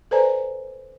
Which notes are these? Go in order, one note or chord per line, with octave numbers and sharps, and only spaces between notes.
A4 B4 C5 D5 G#5 A#5